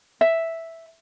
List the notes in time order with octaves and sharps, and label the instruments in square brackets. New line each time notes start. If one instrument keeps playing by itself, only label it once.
[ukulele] E5